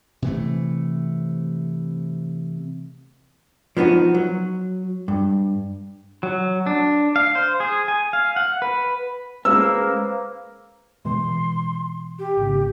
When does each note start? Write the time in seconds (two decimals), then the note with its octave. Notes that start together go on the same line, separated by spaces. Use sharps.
0.22 C3 E3 A3
3.77 F3 B3 D4 D#4 F#4
4.14 F#3
5.08 G2
6.23 F#3
6.67 D4
7.16 F5
7.35 C5
7.60 G#4
7.88 G#5
8.13 F5
8.36 F#5
8.62 B4
9.45 G#3 A#3 C#4 B4 C5 F5 E6
11.05 B2 E3 G#3 C6
12.19 G4
12.37 G#1 C#3